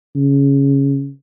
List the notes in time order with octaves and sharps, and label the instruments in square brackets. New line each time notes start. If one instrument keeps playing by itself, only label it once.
[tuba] C#3